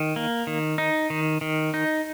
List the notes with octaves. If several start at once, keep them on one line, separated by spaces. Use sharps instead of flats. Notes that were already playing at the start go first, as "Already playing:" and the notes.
Already playing: D#3
A#3
D#3
D#4
D#3
D#3
D#4